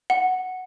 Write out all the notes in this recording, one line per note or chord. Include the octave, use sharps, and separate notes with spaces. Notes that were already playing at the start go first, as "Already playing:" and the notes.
F#5